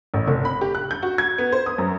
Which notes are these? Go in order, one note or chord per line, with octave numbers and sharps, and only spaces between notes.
A1
F1
B5
G4
F#6
G6
F#4
G#6
B3
C5
D#6
F#2